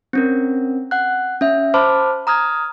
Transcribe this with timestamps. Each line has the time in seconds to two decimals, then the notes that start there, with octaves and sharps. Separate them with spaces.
0.13 C4 C#4 A#4
0.91 F#5 F#6
1.41 C#4 E5
1.74 C5 A5 B5 D6 F6
2.27 A#5 D#6 F6 G#6